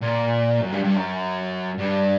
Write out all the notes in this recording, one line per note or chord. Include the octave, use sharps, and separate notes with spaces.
A#2
F#2
G2
G2
F#2
G2